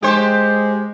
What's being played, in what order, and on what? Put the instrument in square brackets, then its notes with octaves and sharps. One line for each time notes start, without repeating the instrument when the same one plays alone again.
[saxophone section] G#3 [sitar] G4 C5